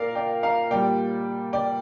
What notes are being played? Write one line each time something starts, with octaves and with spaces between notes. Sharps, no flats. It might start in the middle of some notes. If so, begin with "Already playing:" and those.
Already playing: A#2 A#4 D5 F5
D5 G5
F5 A#5
A#2 G3 D5 G5
D5 G5